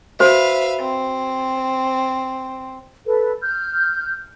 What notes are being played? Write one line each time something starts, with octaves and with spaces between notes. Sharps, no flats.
F#4 B4 C5 E5 F5
C4
A4 B4
F6 G6